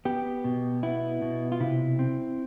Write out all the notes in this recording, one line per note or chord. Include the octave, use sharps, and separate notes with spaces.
B3 G4
B2
B3 E4
B2
F4
C3 E4
C4